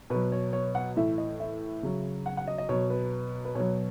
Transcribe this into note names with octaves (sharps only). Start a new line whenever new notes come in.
B2 F#3 B4
C#5
C#5
F#5
A2 E3 E5
D#5
E5
C#3 F#3
F#5
F#5
D#5
D#5
B2 F#3 C#5
B4
B4
B2 F#3 C#5